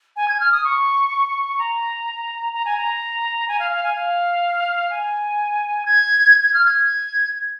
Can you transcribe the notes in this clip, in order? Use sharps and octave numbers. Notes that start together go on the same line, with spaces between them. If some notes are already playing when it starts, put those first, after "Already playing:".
G#5
G#6
F6
D#6
C#6
A#5
A#5
G#5
A#5
G#5
F5
F5
G#5
F5
G#5
G#6
G#6
F6
G#6